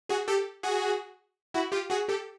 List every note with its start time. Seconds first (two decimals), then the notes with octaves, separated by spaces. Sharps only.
0.09 F#4 G#4
0.28 G4 A4
0.63 F#4 G#4
1.54 E4 F#4
1.72 F4 G4
1.90 F#4 G#4
2.09 G4 A4